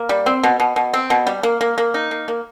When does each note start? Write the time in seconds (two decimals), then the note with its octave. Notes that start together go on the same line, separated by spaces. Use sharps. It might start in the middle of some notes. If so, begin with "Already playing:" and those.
Already playing: A#3
0.09 G3
0.26 C4
0.43 B2
0.60 B2
0.76 B2
0.93 C4
1.10 B2
1.27 G3
1.43 A#3
1.61 A#3
1.78 A#3
1.94 D#4
2.11 A#3
2.28 A#3